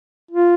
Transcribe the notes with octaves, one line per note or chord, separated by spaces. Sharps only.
F4